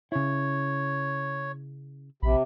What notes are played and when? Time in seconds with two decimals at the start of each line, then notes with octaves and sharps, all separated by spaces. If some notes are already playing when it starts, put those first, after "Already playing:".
0.12 C#3 E4 C#5
2.23 A#1 C3 B5